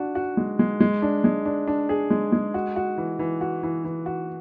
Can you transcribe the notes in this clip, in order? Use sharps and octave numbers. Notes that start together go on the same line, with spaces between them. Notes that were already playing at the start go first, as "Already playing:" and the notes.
Already playing: D4 F#4
F#4
G#3
G#3
G#3
D4
G#3
D4
D4
G#4
G#3
G#3
F#4
F#4
E3
E3
F#4
E3
E3
F#4